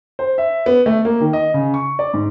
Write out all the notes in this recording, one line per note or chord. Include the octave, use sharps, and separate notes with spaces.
C5
E5
B3
A3
A#3
D#3
D#5
C#3
C#6
D5
G#2